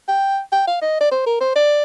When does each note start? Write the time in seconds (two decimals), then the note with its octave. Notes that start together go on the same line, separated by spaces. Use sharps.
0.08 G5
0.52 G5
0.67 F5
0.82 D#5
1.00 D5
1.11 C5
1.26 A#4
1.41 C5
1.56 D5